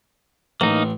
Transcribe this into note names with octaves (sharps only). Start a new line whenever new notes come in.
A1 A#3 D#4